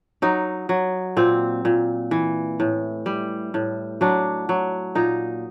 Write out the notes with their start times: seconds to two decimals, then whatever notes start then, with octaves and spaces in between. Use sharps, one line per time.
0.22 F#3 D#4
0.69 F#3
1.17 A#2 C4
1.65 A#2
2.11 E3
2.60 A2
3.06 G3
3.54 A2
4.01 F#3 D4
4.49 F#3
4.95 A#2 D#4